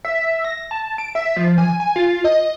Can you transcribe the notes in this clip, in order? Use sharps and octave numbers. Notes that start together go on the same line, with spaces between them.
E5
A#6
A5
D7
E5
F3
G#5
G#5
F4
D#5